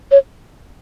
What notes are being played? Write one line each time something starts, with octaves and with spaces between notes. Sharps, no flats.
C#5